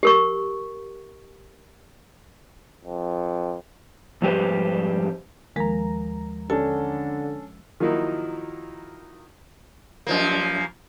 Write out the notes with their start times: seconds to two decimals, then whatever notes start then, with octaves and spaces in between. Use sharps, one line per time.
0.03 G4 A#4 C#6
2.84 F2
4.22 F2 G#2 G3 G4 B4 C5
5.56 D#2 F3 G#3 A#4 A#5
6.50 D3 C#4 D4 A4 A5
7.80 D#3 F3 F#3 A#3 D#4 E4
10.07 F#2 F3 A#3